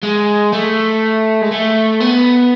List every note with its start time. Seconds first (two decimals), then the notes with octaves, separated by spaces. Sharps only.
0.03 G#3
0.53 A3
1.42 G#3
1.51 A3
2.00 B3